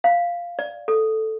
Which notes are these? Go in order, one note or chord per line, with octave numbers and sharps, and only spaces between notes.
F5
D5
A4